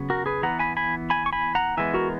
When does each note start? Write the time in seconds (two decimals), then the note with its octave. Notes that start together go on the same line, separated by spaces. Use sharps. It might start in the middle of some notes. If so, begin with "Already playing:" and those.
Already playing: C#3 F#3 B3
0.10 F#4 A#4
0.26 G#4 B4
0.43 E3 B3 F#5 A#5
0.59 G#5 B5
0.77 G#5 B5
1.10 G#5 B5
1.26 C#6
1.33 G#5 B5
1.55 F#5 A#5
1.77 E3 G#3 B3 E5 G#5
1.94 F#4 A#4